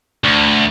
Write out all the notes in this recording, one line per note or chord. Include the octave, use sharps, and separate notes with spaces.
D2